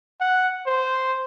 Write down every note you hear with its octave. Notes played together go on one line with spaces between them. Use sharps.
F#5
C5